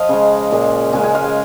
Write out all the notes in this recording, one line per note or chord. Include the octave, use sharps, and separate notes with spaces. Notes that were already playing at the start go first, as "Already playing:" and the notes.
Already playing: F3 D#5 F5
C#3 G#3
A#2 G#3
C#3 G#3 G#5
G#5
F5
G#5